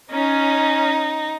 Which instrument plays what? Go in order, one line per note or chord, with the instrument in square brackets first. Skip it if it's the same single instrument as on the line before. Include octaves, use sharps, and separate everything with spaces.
[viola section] C#4 [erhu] D#4